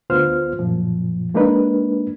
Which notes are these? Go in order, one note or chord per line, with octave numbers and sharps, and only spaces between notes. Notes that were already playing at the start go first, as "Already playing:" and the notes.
D2 B3 F4 C5 F6
F#2 A#2 F3
G#3 A#3 D4 D#4 B4